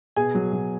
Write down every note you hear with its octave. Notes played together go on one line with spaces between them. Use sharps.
B2 G#4 G#5
F#3
F#3